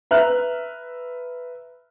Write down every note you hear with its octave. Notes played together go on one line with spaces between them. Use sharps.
B4 E5 A#5 F6 F#6